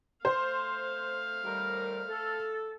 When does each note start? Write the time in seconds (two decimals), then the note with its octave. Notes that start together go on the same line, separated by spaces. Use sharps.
0.25 A3 C5 F5
1.44 D#2 G3 A#4
2.08 A4